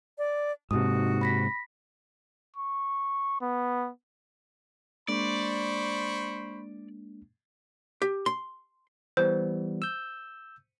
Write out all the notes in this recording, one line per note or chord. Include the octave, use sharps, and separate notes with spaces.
D5
G#2 C3 D#4 F#4 D#6
B5 A#6 B6
C#6
B3
G#3 A#3 D4 C5 D5 B5 C#6
G4
C6
E3 G3 B3 C5
E6 G6